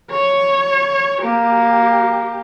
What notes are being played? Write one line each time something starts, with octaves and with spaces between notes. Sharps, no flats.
C#5
A#3 G4